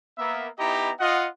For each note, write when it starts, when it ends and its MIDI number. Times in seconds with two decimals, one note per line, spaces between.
0.18 0.47 58
0.18 0.47 59
0.18 0.47 76
0.58 0.91 59
0.58 0.91 63
0.58 0.91 64
0.58 0.91 67
0.58 0.91 75
0.58 0.91 82
1.00 1.27 65
1.00 1.27 75
1.00 1.27 78